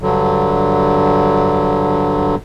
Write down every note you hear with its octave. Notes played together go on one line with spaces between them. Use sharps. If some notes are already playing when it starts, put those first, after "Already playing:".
G2 D3 F#3